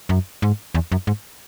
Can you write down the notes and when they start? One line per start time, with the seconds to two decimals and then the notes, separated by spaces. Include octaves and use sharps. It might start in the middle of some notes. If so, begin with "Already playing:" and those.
0.09 F#2
0.42 G#2
0.74 E2
0.92 F#2
1.07 G#2